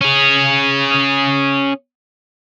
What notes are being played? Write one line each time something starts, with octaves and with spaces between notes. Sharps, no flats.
C#4 G#4